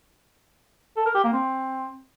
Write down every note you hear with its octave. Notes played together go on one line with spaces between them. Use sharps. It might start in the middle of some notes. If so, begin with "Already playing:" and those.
A4
A#4
G4
A#3
C4